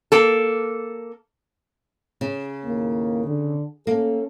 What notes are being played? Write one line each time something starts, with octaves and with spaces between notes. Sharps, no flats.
A#3 A4
C#3
D#2 A2 A#3
D3
A3 A#3 C#4 A4